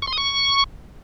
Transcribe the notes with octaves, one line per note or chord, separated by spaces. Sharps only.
C#6
C6
D#6
C#6